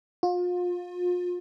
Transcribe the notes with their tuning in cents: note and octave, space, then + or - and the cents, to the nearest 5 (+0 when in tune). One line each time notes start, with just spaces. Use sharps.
F4 +35